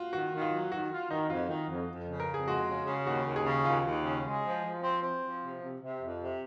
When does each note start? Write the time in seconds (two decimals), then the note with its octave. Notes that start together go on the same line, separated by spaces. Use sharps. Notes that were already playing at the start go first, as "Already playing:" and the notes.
Already playing: F4 F#4
0.13 D#3 F#4
0.32 D#3
0.41 F4
0.52 F#3
0.71 D#3 F#4
0.90 F4
1.10 D#3 D#4
1.29 F2 F4
1.49 D#3
1.69 F2
1.89 F2
2.08 C#3
2.20 A#4
2.28 F2
2.34 G#4
2.47 G#3 F#4
2.66 C#3
2.86 C#3
3.06 D#2 F#4
3.25 D#2
3.36 G#4
3.45 C#3
3.65 D#2 F4
3.84 D#2
4.03 C#3
4.24 G#3
4.44 F3
4.63 F3
4.82 C4
5.02 C4
5.21 F3
5.41 C3
5.60 C3
5.81 C3
6.00 F2
6.19 C3